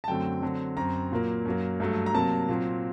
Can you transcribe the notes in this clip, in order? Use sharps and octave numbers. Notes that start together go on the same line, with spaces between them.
A5
F#2 D3 F#3 A3 C4 G5
D3 F#3 C4
F#2 F#3 C4 A#5
A#2 F#3 A#3
F#2 F#3 A#3
G2 F#3 A3
A#5
C3 F#3 A#3 A5
A#2 F#3 C4